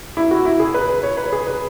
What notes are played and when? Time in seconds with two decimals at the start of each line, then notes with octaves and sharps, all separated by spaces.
0.17 E4
0.31 F#4
0.45 E4
0.60 G#4
0.74 B4
0.89 B4
1.03 C#5
1.17 B4
1.32 G#4
1.47 B4